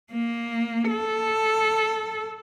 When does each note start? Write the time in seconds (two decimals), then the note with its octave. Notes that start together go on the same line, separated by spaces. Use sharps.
0.13 A#3
0.91 A4